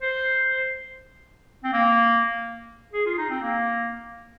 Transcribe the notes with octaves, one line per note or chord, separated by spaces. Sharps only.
C5
C4
A#3
G#4
F4
D#4
C4
A#3